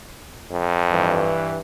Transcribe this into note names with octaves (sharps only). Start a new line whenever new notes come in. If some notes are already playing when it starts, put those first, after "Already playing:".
F2
G2 E3